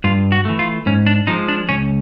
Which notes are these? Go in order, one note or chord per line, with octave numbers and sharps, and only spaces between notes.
G2 F4
F#4
E3 A3
F4
G#2 C#4
D4
F3 G#3 D#4
D4
C#2 C#4